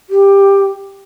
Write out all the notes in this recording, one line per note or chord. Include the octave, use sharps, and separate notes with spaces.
G4